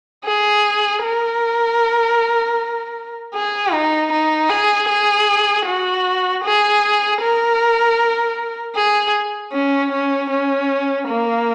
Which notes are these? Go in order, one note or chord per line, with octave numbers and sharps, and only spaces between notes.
G#4
A#4
G#4
D#4
D#4
G#4
G#4
F#4
G#4
A#4
G#4
C#4
C#4
C#4
A#3